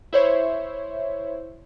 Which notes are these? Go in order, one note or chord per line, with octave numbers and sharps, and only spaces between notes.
E4 C5 C#5 E5